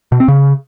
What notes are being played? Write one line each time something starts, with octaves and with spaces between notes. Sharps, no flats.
B2
C4
C#3